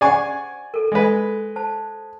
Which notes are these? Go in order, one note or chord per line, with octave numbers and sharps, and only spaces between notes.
G4 C5 D5 F#5 G#5 C#6
A4 A#4
G#3 B4
C5 A5